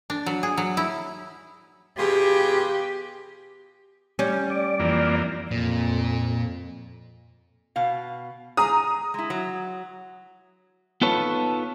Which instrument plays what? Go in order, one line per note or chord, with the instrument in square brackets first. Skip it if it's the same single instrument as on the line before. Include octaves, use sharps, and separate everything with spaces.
[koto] D4
F#3
G#4
F#3
E4
[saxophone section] B2 F4 G#4 [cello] G4
[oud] G3 C#4
[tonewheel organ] D5
[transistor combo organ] F2 E3 A#3
[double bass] F2 [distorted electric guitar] A#2
[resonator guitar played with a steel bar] B2 F5
[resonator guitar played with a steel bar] G#4 [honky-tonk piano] A#5 D#6
[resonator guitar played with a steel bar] G#3 E4
F#3
[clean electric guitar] B3 D#4 F4 A4 B4 C#5